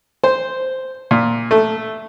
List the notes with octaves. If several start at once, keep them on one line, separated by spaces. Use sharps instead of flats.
C5
A#2
A3